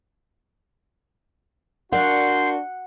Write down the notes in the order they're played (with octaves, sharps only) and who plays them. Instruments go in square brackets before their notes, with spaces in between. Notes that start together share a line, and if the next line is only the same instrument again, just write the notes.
[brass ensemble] D4 F#4 [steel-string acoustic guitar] A#4 D5 F5 [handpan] F#5 [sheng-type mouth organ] C6 G6